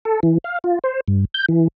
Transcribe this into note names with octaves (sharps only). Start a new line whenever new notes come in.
A4
E3
F5
F4
C5
G2
G6
E3